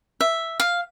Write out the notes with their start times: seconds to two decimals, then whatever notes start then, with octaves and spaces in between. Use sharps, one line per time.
0.21 E5
0.60 F5